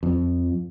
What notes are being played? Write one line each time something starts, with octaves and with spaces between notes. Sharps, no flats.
F2